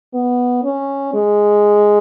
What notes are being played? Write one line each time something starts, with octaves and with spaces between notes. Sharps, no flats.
B3
C#4
G#3